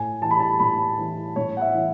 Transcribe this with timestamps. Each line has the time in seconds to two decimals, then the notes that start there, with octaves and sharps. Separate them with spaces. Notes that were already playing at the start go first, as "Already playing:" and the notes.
Already playing: A2 G#5
0.22 E3 A5
0.31 B5
0.40 A5
0.59 A2 B5
0.98 E3
1.36 A2 C#5
1.57 F#5
1.61 E5
1.74 E3